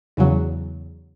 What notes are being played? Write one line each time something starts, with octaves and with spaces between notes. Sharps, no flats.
E2 C#3 F#3